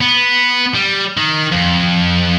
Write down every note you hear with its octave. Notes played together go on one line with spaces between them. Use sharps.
B3
G3
D#3
F2